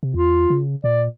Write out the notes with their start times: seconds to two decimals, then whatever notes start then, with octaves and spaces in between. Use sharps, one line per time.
0.03 C3
0.14 E2 F4
0.50 C#3
0.84 A#2 D5